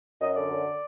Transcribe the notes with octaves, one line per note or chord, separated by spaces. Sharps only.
F#2 D#5
D3 D5
F#2